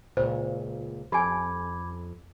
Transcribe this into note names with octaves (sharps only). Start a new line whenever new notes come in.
C#2 A#2 C5
F2 G4 G#5 B5 D6 G#6